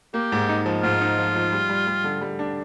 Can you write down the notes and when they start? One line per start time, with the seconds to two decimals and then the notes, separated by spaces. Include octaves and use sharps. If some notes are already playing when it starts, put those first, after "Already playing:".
0.14 A#3 G4
0.32 G#2
0.49 D#4
0.66 F3
0.83 G#2 F4
1.01 D#4
1.18 F3
1.35 F3
1.53 G3
1.70 G3
1.87 G3
2.04 D3
2.21 G3
2.39 D4